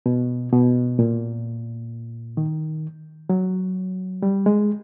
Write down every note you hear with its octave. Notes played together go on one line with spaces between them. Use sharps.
B2
B2
A#2
D#3
F#3
G3
G#3